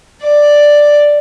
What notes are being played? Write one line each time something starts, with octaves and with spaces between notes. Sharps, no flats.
D5